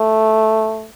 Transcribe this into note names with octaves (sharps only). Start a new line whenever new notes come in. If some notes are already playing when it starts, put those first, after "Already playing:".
Already playing: A3